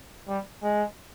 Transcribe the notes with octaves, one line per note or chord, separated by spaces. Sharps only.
G3
G#3